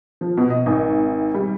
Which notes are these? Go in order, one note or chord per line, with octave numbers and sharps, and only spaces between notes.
F3
B2
D#5
G#1
G3